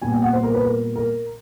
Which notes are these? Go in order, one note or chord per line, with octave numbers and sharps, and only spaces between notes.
A#2 G3 B3 G#5
G5
F#5
C5
A#4
B4
A#4
A#4